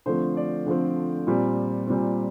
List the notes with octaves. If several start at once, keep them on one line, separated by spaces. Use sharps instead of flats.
D3 F3 A3 C4 C5
D5
D3 F3 A3 C4
A#2 G3 C4
A#2 G3 C4